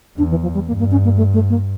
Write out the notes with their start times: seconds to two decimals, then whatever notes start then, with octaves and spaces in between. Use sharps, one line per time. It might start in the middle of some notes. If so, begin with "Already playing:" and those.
0.17 E2 D4
0.30 E3
0.42 F3
0.54 G3
0.67 G2 A#3
0.79 A#3
0.91 C#4
1.04 A#3
1.17 A3
1.33 A3
1.49 A#3